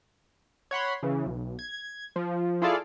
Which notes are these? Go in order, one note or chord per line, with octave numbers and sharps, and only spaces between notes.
C#5 F#5 B5 C6
C#3 E3
B1
G#6
F3
E4 F4 G#4 A4 D5 F5